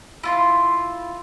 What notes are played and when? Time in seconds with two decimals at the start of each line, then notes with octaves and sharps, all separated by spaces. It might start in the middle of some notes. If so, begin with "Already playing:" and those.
0.23 E4 F4 C6